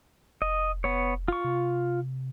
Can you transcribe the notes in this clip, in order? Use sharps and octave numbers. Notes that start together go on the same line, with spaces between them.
F1 D#5
B3 C#5
F4 C#6
C3